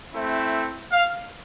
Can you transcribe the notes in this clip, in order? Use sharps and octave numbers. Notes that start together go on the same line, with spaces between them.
A3 C4 E4
F5